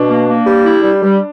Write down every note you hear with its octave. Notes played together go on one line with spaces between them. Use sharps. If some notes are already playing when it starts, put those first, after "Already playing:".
Already playing: B2 D4
A#3
A#3
G3
E4
G3
G3